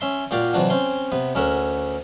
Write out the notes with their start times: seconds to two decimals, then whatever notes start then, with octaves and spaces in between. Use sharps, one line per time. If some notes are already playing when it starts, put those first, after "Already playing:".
0.01 C#4 E5 C6
0.31 A#2 F#4 G4 D5 F5
0.53 C3 E3 F#3 D4 F#4
0.70 C4 C#4 C6
1.12 C3 B3 B4
1.35 D2 C#4 A#4 E5 F#5